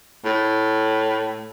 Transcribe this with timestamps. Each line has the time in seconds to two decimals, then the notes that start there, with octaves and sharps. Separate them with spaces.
0.25 A2